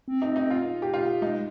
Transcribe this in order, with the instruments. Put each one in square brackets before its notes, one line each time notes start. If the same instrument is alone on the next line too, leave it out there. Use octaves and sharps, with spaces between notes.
[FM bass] C4
[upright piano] D#4
D#4
F4
G4
F4
[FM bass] G#3 [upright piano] D#4